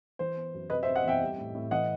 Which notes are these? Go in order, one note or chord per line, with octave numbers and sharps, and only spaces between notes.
E3 C5
B3
F#2
C3 B4 D#5
C5 E5
C4
D#5 F#5
E2 E5 G5
G3
A2
A2
E3 D#5 F#5